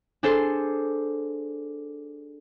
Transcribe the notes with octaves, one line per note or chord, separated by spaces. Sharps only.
D4 G#4 A4 C5